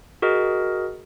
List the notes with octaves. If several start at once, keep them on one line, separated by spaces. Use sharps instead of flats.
F#4 G#4 A#4 D#5